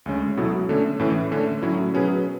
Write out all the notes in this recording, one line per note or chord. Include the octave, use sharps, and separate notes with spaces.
D2 C#3 G#3 C#4
B2 F#3 B3 E4 A4
D3 A3 C#4
A2 E3 A3 C#4
D3 A3 C#4
A2 F#3 C#4 E4
B2 F#3 C#4 G#4 B4